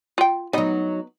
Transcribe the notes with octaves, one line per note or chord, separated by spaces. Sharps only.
F4 G5
F#3 B3 D#4 D#5 F#5